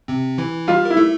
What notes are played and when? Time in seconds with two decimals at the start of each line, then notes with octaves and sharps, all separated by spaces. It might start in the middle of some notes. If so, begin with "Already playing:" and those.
0.08 C3 C4
0.38 E3 E4
0.68 G3 F4 G4
0.85 E4 A#4
0.97 A3 A4